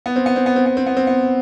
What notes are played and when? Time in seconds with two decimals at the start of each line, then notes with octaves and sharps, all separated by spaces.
0.06 B3
0.16 C4
0.26 B3
0.36 C4
0.46 B3
0.56 C4
0.66 B3
0.77 C4
0.86 B3
0.97 C4
1.07 B3